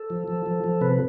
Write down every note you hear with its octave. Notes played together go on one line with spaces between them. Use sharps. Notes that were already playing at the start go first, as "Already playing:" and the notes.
Already playing: A4
F3
F3
F3
F3
C3 B4